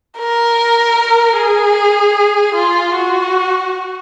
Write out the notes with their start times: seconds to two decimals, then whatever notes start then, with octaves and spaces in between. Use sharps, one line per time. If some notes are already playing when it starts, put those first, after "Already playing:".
0.19 A#4
1.37 G#4
2.55 F4
2.95 F#4